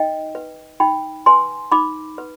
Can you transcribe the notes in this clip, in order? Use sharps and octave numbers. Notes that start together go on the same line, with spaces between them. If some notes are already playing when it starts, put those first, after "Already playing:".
Already playing: D#4 D#5 G5
B4
D#4 G5 B5
B4 G#5 C6
D#4 B5 D6
B4